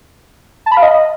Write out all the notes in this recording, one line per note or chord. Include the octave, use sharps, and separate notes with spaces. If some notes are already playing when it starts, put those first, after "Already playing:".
A5
B5
F5
D#5